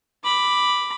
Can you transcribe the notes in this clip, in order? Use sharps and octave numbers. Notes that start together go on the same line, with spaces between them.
B5 D6